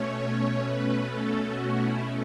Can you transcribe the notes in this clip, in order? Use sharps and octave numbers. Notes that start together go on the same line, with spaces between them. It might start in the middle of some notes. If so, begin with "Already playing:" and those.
Already playing: B2 A3 C#4 C#5
B4
A4
F#4
E4